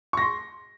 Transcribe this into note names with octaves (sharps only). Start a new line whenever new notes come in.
C6 C#6 A#6